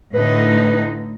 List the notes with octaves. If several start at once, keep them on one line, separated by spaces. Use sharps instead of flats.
A2 D3 D#4 B4